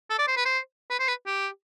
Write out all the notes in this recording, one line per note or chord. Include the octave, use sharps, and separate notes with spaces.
A4
D5
C5
B4
C5
B4
C5
B4
G4